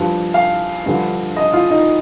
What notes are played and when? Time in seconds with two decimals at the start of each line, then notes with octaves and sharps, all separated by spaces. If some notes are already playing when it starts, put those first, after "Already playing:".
Already playing: G2 F3
0.34 F5
0.86 G2 D3 F3
1.37 D#5
1.53 F4
1.71 D#4